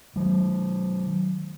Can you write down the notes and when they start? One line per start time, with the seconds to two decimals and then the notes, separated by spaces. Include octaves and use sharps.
0.16 D#3 F#3